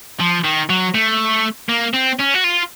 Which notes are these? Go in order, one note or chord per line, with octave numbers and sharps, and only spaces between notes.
F3
D#3
F#3
A3
A#3
C4
C#4
F#4
F4